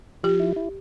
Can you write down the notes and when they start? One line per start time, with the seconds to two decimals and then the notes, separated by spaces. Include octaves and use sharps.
0.23 F3 G4
0.40 E4
0.56 E4